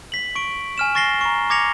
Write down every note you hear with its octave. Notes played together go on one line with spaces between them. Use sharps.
B6 F#7
C#6 D7
G#5 F6 E7
C#6 A6 A#6 C7 G7
A#5 C#6
A#5 D6 G#6 A#6 C#7 F7